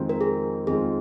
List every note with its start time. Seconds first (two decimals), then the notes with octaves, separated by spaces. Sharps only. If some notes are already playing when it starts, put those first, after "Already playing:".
Already playing: F2 D#3 G#3 C4 F4
0.09 A#4
0.21 G#4
0.67 F2 D#3 G#3 C4 F4 G#4